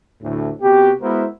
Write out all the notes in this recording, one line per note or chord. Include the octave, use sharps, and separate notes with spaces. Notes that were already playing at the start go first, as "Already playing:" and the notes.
D2 A2
C3 B3 F#4 G4
G#3 B3 E4 F#4 A#4 C5